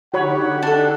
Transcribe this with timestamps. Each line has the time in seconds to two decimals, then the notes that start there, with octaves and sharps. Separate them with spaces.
0.14 D3 D#4 F#4 G4 C#5 F#5 B5
0.62 D4 A4